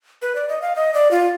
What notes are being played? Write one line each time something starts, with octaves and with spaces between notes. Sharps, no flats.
B4
D5
D#5
F5
D#5
D5
F4